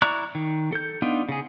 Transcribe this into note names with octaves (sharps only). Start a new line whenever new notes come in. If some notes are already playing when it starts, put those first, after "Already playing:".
E4 D5 A#5 C#6 F#6
D#3
A4 G6
B3 D4 D#4 F4
C#3 G#4